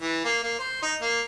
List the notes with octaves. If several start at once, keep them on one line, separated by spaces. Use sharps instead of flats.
E3
A#3
A#3
C5
D#4
A#3